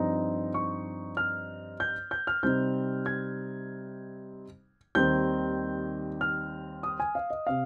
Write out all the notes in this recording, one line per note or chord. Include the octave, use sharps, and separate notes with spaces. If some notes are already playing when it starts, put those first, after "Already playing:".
Already playing: G2 F3 C4 D#4 A#5
C#6
F6
G6
G6
F6
C3 G3 C4 D#4 G6
G#6
D#2 D#3 G3 C4 G6
F6
D#6
G#5
F5
D#5
C3 F5